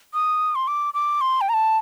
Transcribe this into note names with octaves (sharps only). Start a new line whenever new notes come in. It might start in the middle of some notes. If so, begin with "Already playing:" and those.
D#6
C6
D6
D6
C6
G5
A#5
A5